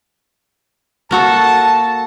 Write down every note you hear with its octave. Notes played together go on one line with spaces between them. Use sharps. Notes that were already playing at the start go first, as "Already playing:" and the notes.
A#3 F#4 A4 A5